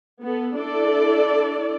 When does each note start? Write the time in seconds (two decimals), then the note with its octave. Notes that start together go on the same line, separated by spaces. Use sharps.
0.22 B3 A4
0.56 D4 E4 A4 D5